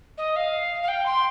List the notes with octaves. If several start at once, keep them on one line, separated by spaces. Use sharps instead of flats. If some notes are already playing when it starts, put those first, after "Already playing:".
D#5
F5
F5
G5
C6